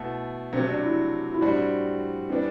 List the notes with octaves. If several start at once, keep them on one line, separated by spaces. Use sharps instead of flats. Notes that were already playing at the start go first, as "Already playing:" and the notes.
Already playing: B2 A3 B3 E4 A4
C3 F#3 A3 C4
D4
E4
E4
A2 G3 C4 D4 F#4
E3 G3 B3 C4 D4